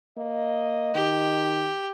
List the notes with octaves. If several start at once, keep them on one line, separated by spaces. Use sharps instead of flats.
A#3 D#5
D#3 G4